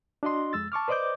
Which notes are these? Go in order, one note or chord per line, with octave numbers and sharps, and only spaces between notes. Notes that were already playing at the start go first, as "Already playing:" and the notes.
D4 F#4 D#5 C6
F2 G#3 E6 A6
A5 C#6 D6 F6
B4 C5 D5 D#5 D6 G6